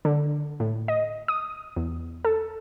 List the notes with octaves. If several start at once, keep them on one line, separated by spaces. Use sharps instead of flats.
D3
A2
D#5
D#6
E2
A4